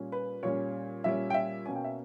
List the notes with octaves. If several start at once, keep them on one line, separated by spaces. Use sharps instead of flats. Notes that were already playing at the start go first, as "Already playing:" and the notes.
Already playing: A#2 G3 C#4
B4
A#2 G3 C#4 C#5
A#2 G3 C#4 E5
G5
E5
B2 A#3 C#4 G#5
G5
E5